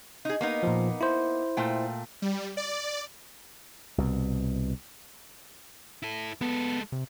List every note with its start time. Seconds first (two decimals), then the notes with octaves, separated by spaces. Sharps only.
0.25 D#4 G#4
0.41 A#3 B3 D#4
0.63 A#2 F3
1.01 E4 C5
1.57 A#2 A3 G5
2.22 G3
2.57 D5
3.98 C2 B2
6.03 E4 A4
6.41 G#3 B3 A4
6.92 C3